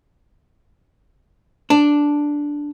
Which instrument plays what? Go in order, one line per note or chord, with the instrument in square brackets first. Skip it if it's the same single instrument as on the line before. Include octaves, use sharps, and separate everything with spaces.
[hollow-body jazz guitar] D4